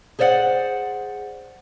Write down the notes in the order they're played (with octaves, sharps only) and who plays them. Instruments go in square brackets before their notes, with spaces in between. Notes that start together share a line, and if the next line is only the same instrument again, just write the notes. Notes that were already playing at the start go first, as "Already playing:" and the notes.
[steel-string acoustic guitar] G#4 C5 D5 E5 F#5